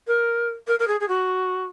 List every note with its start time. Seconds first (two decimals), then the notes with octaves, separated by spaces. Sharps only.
0.07 A#4
0.67 A#4
0.79 A#4
0.87 G#4
1.00 G#4
1.08 F#4